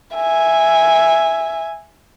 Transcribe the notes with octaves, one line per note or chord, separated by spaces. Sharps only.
E5 G#5